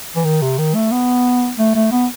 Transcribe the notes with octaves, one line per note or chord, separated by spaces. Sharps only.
E3
D#3
C3
D#3
A3
B3
A3
A3
B3